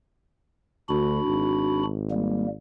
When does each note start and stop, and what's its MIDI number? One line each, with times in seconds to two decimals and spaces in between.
0.89 1.19 38
0.89 1.83 62
0.89 1.83 66
0.89 1.83 83
1.27 2.56 32
2.11 2.47 55
2.11 2.47 58